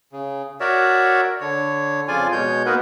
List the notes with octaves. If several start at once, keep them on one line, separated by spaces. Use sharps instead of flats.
C#3
F#4 A#4 C#5 D5 E5
D3 C#5
F2 C#3 F4 D5 G#5
B2 G#3 C#5 G6
A#3 B3 D#4 F#4 A#4 B4